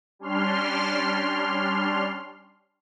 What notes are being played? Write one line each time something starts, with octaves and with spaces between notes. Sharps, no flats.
G3 C#4 D4 C6 F6